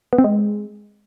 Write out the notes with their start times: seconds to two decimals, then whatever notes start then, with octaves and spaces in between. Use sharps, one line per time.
0.13 B3
0.18 C4
0.24 G#3